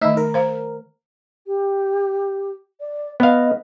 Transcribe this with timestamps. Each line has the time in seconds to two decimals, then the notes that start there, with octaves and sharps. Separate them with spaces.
0.01 D#3 A3 D#4 E5
0.17 A#4
0.34 C5 F5
1.47 G4
2.80 D5
3.20 B3 D#5 F5